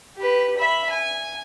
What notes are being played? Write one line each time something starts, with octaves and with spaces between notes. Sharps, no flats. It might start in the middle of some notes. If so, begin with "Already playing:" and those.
G4 B4
E5 B5
G#5